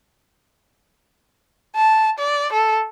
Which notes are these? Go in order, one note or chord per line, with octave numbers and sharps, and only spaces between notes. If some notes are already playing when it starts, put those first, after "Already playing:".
A5
D5
A4